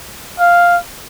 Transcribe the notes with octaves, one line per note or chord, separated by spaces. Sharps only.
F5